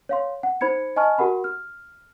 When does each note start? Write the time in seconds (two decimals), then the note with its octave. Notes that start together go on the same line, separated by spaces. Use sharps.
0.09 C#5 F5 C6
0.43 F#5
0.61 D#4 C5 B5 G#6 C#7
0.96 D#5 G#5 A5 C#6 F6
1.18 F#4 G4 A#4 F#5 B5
1.44 F6